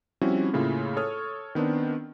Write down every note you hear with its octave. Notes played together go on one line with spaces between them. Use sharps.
F3 G3 C4 C#4 E4 F#4
A2 C#3 A#3 E4 F4
A4 C#5 C#6 D#6 F6
D#3 B3 C4 D4